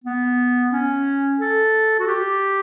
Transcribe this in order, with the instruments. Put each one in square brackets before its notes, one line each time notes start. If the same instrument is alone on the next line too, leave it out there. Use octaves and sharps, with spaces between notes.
[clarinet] B3
C#4
A4
F#4
G4